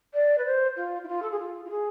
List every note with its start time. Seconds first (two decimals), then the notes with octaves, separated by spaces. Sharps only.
0.14 D5
0.38 B4
0.45 C5
0.76 F4
1.03 E4
1.08 F4
1.22 A4
1.31 G#4
1.39 F4
1.64 F4
1.70 G#4